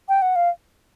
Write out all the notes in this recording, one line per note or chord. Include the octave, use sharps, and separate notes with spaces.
G5
F#5
F5